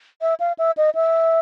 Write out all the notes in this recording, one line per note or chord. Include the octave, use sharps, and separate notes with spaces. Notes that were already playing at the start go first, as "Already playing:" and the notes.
E5
F5
E5
D#5
E5